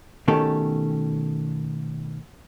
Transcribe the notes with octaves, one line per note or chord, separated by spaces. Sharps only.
B2 D#3 A3 C#4 G4 A4